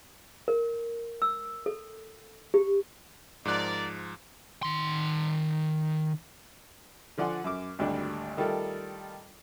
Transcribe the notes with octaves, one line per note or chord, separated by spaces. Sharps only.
A#4
E6
A4
G4
G#2 F3 A#4 D5 F#6
D#3 C6
D3 F3 D5 F#5 G#5 C6
F#2 D6
G#1 D2 G3 D4
D#3 G3 A3 F4 A4 A#4